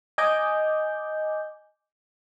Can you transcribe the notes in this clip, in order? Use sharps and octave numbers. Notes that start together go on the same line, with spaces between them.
D#5 G#5 D6 G6